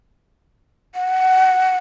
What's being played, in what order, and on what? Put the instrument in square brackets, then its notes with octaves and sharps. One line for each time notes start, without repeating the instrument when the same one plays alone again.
[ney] F#5